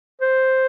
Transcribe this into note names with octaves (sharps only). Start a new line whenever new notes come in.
C5